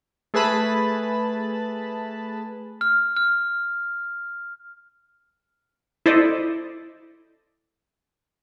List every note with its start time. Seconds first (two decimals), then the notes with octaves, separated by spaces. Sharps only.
0.34 A3 G#4 B4 A5 B5 A6
2.81 F6
3.17 F6
6.06 E4 A4 C5 D5 D#5